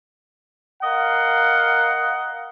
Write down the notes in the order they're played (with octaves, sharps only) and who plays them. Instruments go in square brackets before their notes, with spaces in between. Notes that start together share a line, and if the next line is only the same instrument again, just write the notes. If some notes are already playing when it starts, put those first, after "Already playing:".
[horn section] A#4 D#5 F5 F#5